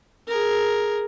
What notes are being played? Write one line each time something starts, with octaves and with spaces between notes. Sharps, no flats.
G#4 A#4